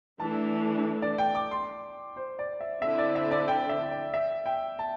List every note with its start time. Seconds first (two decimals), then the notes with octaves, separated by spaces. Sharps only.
0.20 E3 A3 D4 A5
1.02 D5
1.18 G5
1.35 D6
1.51 C6
2.16 C5
2.39 D5
2.61 E5
2.82 D3 C4 E4 E5
2.98 D5
3.16 E5
3.31 D5
3.48 G5
3.69 E5
3.91 D5
4.14 E5
4.46 G5
4.79 A5